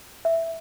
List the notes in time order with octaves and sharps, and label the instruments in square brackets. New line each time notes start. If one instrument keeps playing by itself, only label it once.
[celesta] E5